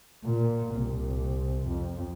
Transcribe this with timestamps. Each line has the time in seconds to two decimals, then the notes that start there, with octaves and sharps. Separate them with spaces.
0.24 A#2
0.76 C2
1.66 F2